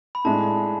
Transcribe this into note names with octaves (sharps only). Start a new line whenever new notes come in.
B5
A2 G#3 D4 A5